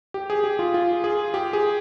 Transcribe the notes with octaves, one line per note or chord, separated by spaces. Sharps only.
G4
G#4
G4
F4
F4
G#4
G4
G#4